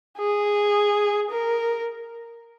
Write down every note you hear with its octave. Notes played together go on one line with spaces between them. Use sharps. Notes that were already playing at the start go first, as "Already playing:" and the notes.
G#4
A#4